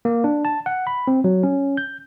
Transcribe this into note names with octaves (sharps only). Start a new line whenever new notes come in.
A#3
D4
A5
F#5
B5
C4
F#3
C#4
G6